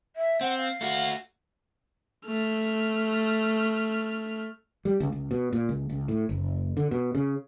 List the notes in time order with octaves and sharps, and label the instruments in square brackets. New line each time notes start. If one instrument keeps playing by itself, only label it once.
[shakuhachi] E5
[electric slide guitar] C4 [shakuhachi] F#5
[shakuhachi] F5
[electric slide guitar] A3 F#4
[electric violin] A3 F6
[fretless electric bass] G3
C#2
C#2
B2
A#2
C#2
C#2
A2
F#1
D3
B2
C#3